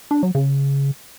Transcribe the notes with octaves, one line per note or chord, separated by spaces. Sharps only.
D4
F#3
C#3